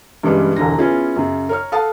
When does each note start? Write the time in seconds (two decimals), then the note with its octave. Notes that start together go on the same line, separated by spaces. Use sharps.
0.23 G2 C#3 E3 G3 G#3
0.56 E1 C2 D3 A#6
0.78 B3 C#4 E4 F4 G#4
1.16 F#2 C#3
1.49 A#4 C#5 F6
1.72 A4 F5 F#5 A5 D#6